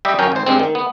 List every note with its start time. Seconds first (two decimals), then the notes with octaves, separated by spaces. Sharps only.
0.05 G3 G4 D#5 E5
0.19 F#2 F#3 C#4 A#4 G5
0.32 G#1 C5
0.46 G2 G#3 C4
0.60 D#3
0.75 B3